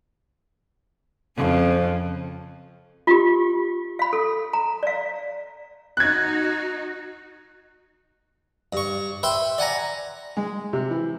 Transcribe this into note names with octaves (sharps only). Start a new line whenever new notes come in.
F2 C#3 F3
F4 G4
F5 B5
A4
A#5
D5 F5
D#4 F#4 F#6 G#6
G2 C#6
B4 E5 G5 B5 C6
D5 F#5 G#5 A#5
G#3
C3
E3